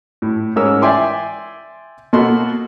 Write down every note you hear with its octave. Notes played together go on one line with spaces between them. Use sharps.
A2
G#2 C#4 A#4 E6
D5 E5 G5 G#5 C6 D6
B2 A#3 F#4 A4 C6